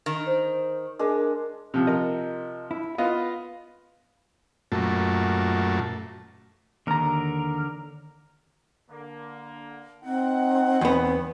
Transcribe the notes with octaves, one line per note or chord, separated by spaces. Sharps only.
D#3
C5
G#3 D4 A#4
C3 F3
A#4 D#5
E4
B3 F4 D#5 F5
F#2 A#2 A3
D#2 D3 A#4 A#5
D3 A#3
C4 D#4 F#5
E2 B3